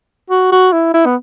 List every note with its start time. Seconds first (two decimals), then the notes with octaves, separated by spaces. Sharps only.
0.30 F#4
0.52 F#4
0.73 E4
0.94 E4
1.06 B3